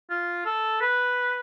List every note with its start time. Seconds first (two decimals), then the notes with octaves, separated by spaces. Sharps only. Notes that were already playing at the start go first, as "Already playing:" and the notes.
0.10 F4
0.46 A4
0.81 B4